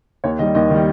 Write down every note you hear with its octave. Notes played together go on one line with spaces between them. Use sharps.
D#2 C#5
D#3 G3 D#5
D#2 D#5
D#3 G3